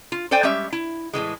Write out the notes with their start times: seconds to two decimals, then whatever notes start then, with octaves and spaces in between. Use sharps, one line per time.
0.12 F4
0.31 A4 C5 D5 G5 G#5
0.43 G3 G#3 C#4 G4 E5
0.73 E4
1.13 A2 C3 E3 G#3